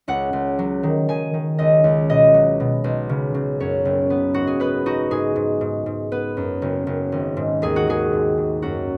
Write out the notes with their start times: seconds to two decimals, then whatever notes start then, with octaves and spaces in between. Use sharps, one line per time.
0.08 C#2 F#5
0.33 C#2
0.59 F#3
0.83 D#3
1.09 D#3 G#5
1.34 D#3
1.59 C#2 D#5
1.84 C#2
2.09 B2 D#5
2.34 F#3
2.60 B2
2.84 B1
3.09 C#3
3.34 C#3
3.60 F#2 C#5
3.85 F#1
4.10 B3
4.34 G#2 F#4
4.47 G#4
4.60 B3 B4
4.86 D#4 F#4
5.11 G#2 G#4
5.36 G#2
5.61 G#2
5.86 G#2
6.12 B3 B4
6.37 F#2
6.62 F#1
6.87 F#1
7.12 G#1
7.37 G#2
7.62 D#2 G#4
7.76 F#4
7.87 D#3 G#4
8.13 G#2
8.38 G#2
8.62 F#2 F#4